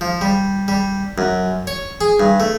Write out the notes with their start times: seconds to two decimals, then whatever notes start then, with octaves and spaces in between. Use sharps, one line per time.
0.01 F3
0.21 G3
0.68 G3
1.18 F#2
1.67 C#5
2.01 G#4
2.20 G2
2.40 A3